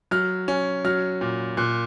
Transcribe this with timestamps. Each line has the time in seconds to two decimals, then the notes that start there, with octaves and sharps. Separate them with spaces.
0.11 F#3 F6
0.48 C#4
0.85 F#3 F6
1.21 A#2
1.57 A#2 F#6